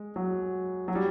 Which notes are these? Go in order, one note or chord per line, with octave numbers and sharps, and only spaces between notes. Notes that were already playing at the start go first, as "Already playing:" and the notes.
Already playing: G#3
F#3
F#3
G3